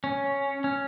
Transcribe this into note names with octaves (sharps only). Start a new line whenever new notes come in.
C#4
C#4